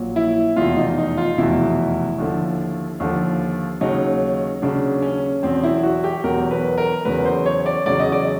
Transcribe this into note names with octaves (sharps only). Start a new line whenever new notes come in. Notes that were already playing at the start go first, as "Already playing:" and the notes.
Already playing: A#1 A#2 F#3
E4
F1 E2 B2 F4
D#4
D#4
F4
F1 E2 B2 E4
D#2 D3 F3
D#2 D3 F3
D#2 C#3 F#3 D#4
D#2 C#3 F#3 D4
C#4
E2 B2 F#3 C4
E4
F#4
G4
E2 B2 F#3 A#4
B4
A#4
E2 C#3 F#3 B4
C5
C#5
D5
E2 C#3 F#3 D5
D#5
D5